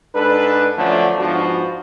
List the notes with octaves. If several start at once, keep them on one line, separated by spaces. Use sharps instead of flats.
G#2 D4 A4 B4
D3 F3 F#3 A3 C#4 D4
G#2 F3 B3 D4 F#4